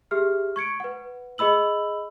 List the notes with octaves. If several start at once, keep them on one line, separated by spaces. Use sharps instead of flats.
G4 G#4 E5 F6
C#6 G#6 C#7 D7
B4 F#5
G#4 D#5 B5 E6 F#7